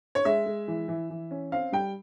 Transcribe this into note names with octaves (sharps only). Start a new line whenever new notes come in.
C#5
G#3 E5
G#3
E3
E3
E3
C#4
C4 F5
G3 G5